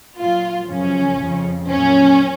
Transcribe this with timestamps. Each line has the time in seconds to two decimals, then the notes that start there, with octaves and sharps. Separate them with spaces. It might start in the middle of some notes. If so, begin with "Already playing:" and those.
0.19 A#2 F#3 F4
0.70 F#2 C#3 F3 C#4
1.20 F2 C#3 F3
1.70 A#2 F#3 C#4